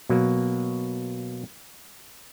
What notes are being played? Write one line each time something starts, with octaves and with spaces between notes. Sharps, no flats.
B2 F#3 A#3